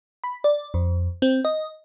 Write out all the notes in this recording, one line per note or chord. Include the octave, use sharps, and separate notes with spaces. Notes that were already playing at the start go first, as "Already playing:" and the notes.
B5
D5
F2
C4
D#5